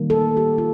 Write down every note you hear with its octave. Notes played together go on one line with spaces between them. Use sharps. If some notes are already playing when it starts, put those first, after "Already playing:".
Already playing: D#3 G3 A#3
A4
G4
F4